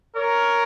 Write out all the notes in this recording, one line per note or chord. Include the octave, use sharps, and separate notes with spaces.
A#4 C#5